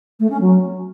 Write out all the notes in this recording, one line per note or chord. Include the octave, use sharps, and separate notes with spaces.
A3
C#4
F#3